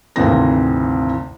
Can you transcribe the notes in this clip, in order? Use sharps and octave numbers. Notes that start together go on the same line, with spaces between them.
G#1 D2 C3 E3 C4 A#6